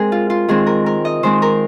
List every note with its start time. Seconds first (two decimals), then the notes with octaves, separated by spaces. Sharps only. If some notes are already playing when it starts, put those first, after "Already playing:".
Already playing: G#3 C4 G#4 A#4
0.12 F4
0.30 F4
0.48 D#3 G#3 C4 G#4
0.66 A#4
0.86 A#4
1.05 D#5
1.23 D#3 G#3 C4 C5
1.42 A#4